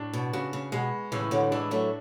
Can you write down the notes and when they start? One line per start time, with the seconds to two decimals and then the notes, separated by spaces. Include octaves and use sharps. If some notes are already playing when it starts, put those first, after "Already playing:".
Already playing: A2 D4
0.13 B2
0.33 C#3 F#4
0.53 C#3
0.72 B2 G#3
1.12 A2 C#3 E3
1.31 D3 F#3
1.51 E3 G#3 D4
1.71 F#3 A3